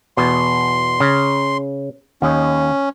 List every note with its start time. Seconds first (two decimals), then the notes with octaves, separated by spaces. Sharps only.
0.17 E2 B2 C6
1.00 C#3
2.22 D#2 C#4 D#5